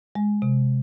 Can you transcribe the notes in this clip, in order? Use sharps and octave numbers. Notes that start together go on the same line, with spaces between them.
G#3
C3